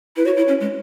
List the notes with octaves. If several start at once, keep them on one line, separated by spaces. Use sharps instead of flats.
E4 B4
F#4 C#5
E4
C#4
G#3